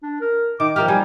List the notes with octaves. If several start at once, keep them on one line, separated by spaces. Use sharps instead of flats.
D4
A#4
D#3 D6
F3 A#3 G4 F6
G3 G#5